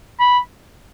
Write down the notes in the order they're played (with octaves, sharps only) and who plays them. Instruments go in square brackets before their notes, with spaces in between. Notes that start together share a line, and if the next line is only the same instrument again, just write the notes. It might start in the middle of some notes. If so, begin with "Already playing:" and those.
[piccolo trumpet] B5